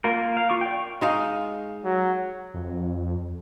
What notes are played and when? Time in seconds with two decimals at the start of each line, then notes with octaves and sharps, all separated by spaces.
0.04 A#3 F4 A#4
0.37 F5
0.50 F4 C#6 D6
0.61 D5 G5
1.01 G#3 D#4 F5
1.85 F#3
2.54 F2